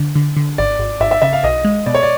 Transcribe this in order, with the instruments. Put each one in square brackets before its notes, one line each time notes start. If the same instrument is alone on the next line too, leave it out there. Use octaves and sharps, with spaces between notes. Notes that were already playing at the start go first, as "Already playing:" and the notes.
Already playing: [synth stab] D3
D3
D3
[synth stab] G#1 [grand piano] D5
[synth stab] G#1
[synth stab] G#1 [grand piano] E5
[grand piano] E5
[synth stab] C#3 [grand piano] E5
[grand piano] F5
[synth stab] B1 [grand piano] D#5
[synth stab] G#3
[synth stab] B2 [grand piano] D5
[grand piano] C#5
D5